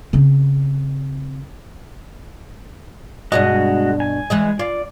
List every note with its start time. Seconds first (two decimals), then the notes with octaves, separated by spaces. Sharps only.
0.13 C#3 C4
3.32 G2 B2 G#3 F#4 D#5
4.00 G#5
4.30 E3 G#3 D#5
4.59 F4 D5